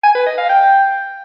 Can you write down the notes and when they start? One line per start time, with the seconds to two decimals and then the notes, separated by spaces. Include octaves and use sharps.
0.04 G#5
0.15 B4
0.26 D#5
0.38 F5
0.49 G5